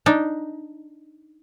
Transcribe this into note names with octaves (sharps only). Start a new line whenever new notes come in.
D4 D#4